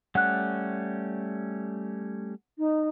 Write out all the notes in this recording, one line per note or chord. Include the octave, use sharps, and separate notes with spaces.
G3 A3 C#4 F#5 F#6
D#4